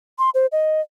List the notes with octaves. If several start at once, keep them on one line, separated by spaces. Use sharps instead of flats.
C6
C5
D#5